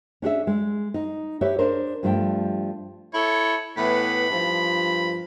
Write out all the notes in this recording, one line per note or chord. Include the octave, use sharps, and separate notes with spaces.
C#4 D4 G#4 E5
G#3
D#4
G4 B4 C#5 E5
D4 G#4 A#4 C5
G2 F3 G3 A3 G5
E4 A4 C#5
A2 E3 B3 B5
G2 F3